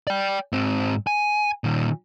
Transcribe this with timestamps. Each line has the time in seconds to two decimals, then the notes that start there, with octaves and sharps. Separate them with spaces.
0.07 D5 G5
0.52 G#2 C4
1.07 G#5
1.64 A#2 D#3